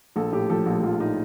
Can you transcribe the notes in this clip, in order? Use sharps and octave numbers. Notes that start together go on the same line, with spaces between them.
A#1 A4
A2 G4
F3 A4
A#1
A#1 F4
A2 D#4